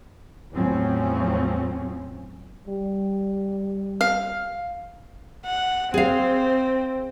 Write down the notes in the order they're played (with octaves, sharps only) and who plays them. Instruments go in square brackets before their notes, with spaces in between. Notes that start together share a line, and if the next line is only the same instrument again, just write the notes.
[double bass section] E2 A2 F3 F#3 C4 C#4
[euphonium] G3
[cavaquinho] F5
[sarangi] F#5
[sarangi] C4 [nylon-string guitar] G#4 F5